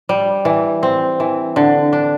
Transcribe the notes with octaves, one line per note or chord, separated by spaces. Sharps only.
G3
E3
C4
E3
D3
D4